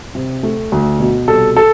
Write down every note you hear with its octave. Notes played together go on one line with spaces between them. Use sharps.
C3
A3
D2
B2
C2 A4
A4